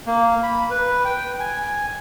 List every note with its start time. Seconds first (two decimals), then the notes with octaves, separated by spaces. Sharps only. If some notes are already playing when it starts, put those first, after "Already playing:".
0.06 A#3
0.43 B5
0.71 B4
1.05 G5
1.40 G#5